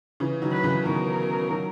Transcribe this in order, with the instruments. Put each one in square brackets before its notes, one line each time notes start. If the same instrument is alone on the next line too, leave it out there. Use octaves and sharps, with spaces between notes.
[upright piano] C#3 E3
D#3 F#3
[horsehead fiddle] B4
[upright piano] C#3 E3
[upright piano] B2 D#3 [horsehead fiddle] A#4
[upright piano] D#3 F#3